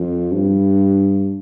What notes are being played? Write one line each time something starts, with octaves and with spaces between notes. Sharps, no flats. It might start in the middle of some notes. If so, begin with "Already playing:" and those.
Already playing: F2
G2